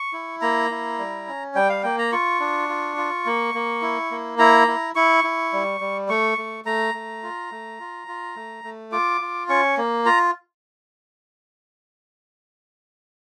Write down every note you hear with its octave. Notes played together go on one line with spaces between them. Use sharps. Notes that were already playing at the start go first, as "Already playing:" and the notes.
Already playing: C#6
E4
A#3 A#5
E4
G3
C#4
G3 G5
F5
A#3 G5
A#5
F4 C#6
D4
F4
F4
A#3
A#3
E4
A#3
E4 A#5
E4
E4 C#6
E4
G3
G3
A3 C#6
A3
A3 A#5
A3
F4
A3
F4
F4
A3
A3
F4 D6
F4
C#4 C#6
A#3
F4 A#5